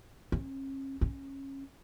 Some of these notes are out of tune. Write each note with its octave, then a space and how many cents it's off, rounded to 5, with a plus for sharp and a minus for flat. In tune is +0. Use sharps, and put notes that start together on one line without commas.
C#4 -40
C#4 -20